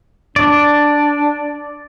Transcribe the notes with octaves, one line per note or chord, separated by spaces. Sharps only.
D4 D5